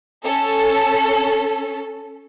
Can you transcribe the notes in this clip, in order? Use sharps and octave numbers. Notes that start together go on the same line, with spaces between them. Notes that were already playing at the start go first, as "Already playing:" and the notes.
C#4 A4